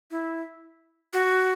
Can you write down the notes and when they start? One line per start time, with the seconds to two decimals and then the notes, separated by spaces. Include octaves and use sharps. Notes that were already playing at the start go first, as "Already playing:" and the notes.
0.11 E4
1.13 F#4